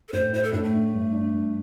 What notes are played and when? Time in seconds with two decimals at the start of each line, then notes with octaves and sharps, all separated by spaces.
0.08 A4
0.12 A2 C5
0.33 E4 C5
0.43 A4
0.53 A2 D4
0.63 A3
0.73 D4
0.93 G2
1.13 D4
1.33 G2